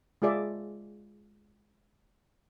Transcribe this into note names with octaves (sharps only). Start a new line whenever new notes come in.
G#3 F4 G#4 D5 E5